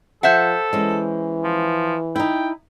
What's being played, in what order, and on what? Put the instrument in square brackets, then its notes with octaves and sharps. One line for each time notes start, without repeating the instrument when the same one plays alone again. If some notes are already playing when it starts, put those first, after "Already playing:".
[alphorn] F3 [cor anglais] A4 [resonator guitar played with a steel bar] C5 E5 F#5
[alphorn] E3 [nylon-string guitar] G#3 C#4
[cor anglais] F3
[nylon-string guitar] D#4 E4 [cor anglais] G5